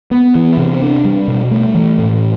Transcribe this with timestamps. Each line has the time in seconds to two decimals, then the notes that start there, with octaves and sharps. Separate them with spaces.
0.11 B3
0.35 E3
0.57 C3
0.82 D4
1.05 G3
1.28 B2
1.51 A3
1.75 E3
1.99 A2